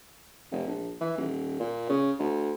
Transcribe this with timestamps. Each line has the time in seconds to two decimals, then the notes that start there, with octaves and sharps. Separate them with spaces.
0.51 F1
0.67 A#1
1.01 E3
1.17 D#1
1.60 A#2
1.89 C#3
2.19 D2